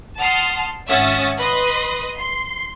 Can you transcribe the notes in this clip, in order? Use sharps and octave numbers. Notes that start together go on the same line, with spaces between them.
F#5 A5 C6 D#6 F6
G#1 C#4 E5 F#5 D#6 A6
B4 D#5 C6 D#6
C6